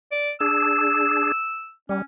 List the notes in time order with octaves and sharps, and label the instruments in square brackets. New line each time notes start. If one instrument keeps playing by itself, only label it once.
[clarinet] D5
[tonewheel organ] D4 G#4 [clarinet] E6
[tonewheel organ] G3 [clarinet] C#4